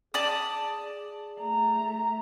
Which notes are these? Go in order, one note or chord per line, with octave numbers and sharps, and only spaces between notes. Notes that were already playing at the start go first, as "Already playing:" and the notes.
G#4 D5 A5 D#6
A3 A#5